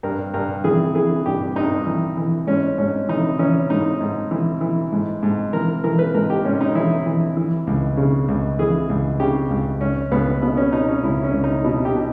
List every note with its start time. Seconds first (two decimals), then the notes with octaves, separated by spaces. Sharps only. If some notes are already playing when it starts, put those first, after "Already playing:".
0.03 G2 A#4
0.34 G2 A#4
0.64 E3 G#4
0.95 E3 G#4
1.26 G2 G4
1.56 G2 D#4
1.86 E3
2.17 E3
2.47 G#2 C#4
2.78 G#2 C#4
3.09 E3 D#4
3.39 E3 C#4
3.70 G#2 D#4
4.01 G#2
4.31 E3
4.61 E3
4.92 G#2
5.23 G#2
5.53 E3 A#4
5.84 E3 A#4
5.99 B4
6.14 G#2 A#4
6.30 G4
6.45 G#2 C#4
6.61 D#4
6.75 E3 E4
7.06 E3
7.37 E3
7.67 C#2
7.97 C#3
8.28 C#2
8.59 E3 G#4
8.90 C#2
9.20 C#3 G4
9.50 C#2
9.81 C#2 C#4
10.11 C#2 B3
10.42 B2 B3
10.57 C#4
10.73 B2 D#4
10.89 C#4
11.03 C#2 E4
11.24 C#4
11.33 C#2
11.44 D#4
11.64 B2 E4
11.85 G4
11.95 B2